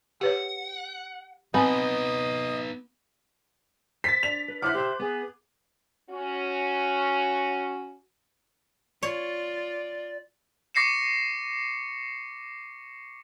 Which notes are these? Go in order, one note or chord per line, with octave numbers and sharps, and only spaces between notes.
G4 B4 C#5 F#5
B3 C4 D#4 B4 D#5 G#5
C5 A6 B6
D4 F7
B4
E4 C5 C#5 E5 F#5 D6 F6 F#6
G4 C5 E5
B3 G#4
C#4 F#4
F4 C#5 D5
C#6 D6 A#6 C7 C#7 E7